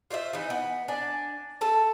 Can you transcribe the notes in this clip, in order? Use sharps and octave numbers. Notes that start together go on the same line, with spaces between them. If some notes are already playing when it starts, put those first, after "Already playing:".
F4 C5 C#5 E5
E3 D#4
B3
D4 D5 G#5
A4 A5